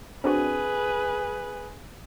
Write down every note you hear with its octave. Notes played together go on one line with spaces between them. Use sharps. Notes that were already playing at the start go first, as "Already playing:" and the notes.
C4 D4 F#4 G#4 B4